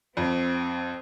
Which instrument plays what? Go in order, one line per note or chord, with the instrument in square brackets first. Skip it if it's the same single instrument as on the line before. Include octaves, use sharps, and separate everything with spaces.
[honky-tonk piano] F2 [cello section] C4